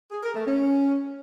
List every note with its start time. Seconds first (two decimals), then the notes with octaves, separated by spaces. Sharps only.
0.12 G#4
0.23 A#4
0.35 A3
0.46 C#4